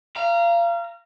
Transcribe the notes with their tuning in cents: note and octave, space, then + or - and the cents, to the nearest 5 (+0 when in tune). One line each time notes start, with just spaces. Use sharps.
F5 -30 A#5 +0